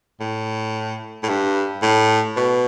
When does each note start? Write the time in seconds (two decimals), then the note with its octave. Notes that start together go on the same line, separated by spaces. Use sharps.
0.20 A2
1.23 A2
1.29 G2
1.82 A2
2.37 B2